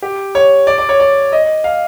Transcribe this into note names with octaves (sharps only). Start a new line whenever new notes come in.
G4
C#5
D5
D5
C#5
D5
D#5
F5